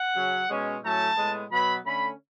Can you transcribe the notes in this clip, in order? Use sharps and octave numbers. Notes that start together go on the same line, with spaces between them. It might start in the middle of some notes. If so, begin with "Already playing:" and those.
Already playing: F#5
C#3 F#3 C#4
B2 G#3 C#4
A2 F#3 A3 C#4 A5
A2 G#3 B3
B2 F#3 B3 B5
D3 A3 C#4 B5